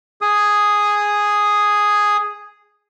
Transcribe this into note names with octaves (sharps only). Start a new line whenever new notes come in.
G#4 D#6